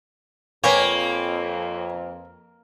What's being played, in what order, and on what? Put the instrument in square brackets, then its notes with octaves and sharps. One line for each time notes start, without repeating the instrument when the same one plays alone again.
[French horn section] F2 [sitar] A#3 [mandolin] B4 G5 G#5 [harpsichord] C#5